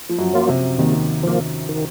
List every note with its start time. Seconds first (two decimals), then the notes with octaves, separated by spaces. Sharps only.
0.09 F3
0.18 F#2 F#3
0.33 F#3 A#3 F4
0.49 C3
0.78 D#2 C3 D#3
1.23 F3 A#3
1.69 D#3